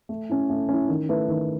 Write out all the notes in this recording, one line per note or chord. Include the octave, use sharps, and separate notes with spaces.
A3
C#4 E4
A3
C#4 E4
D#3
A3 E4 B4
D#3